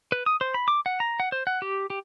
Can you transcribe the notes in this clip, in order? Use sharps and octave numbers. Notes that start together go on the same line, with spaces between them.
B4
D#6
C5
B5
D6
F#5
A#5
F#5
C5
F#5
G4
G4